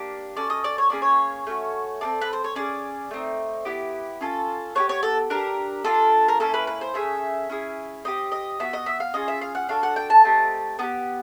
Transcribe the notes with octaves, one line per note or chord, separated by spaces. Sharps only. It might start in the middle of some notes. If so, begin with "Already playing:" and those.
Already playing: A#3 D4 G4 D5
C#4 F#4 A4 D5
D#5
D5
C#5
A#3 C#4 G#4 D5
C#5
A3 C#4 F#4
C4 F4 A4 D5
B4
C5
C#5
C#4 F4 G#4 D5
A3 C4 D#4
B3 E4 G4
C#4 F4 A4
B3 E4 G4 C#5
C#5
A4
D4 G4 A#4
A#3 D4 F4 A4
A#4
A#3 C#4 E4 A4
B4
B4
C5
A3 C#4 G#4 E5
C#4 E4 G#4
C4 D#4 G4 D#5
D#5
B3 D4 F#4 E5
D#5
E5
F5
C#4 F4 G#4 D#5
E5
F5
F#5
D4 F#4 A4 F5
F#5
G5
A5
A3 C4 D#4 G4
B3 D#4 G4